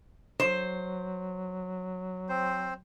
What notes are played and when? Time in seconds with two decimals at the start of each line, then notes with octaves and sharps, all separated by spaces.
0.40 F#3 C5
2.29 C4 C5